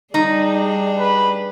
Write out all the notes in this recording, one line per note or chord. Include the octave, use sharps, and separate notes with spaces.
G3 D4 D#4 G#4
B4